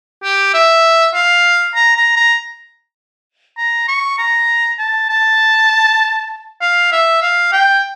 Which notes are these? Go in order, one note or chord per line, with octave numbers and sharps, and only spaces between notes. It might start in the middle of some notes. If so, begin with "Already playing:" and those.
G4
E5
F5
A#5
A#5
A#5
A#5
C#6
A#5
A5
A5
F5
E5
F5
G5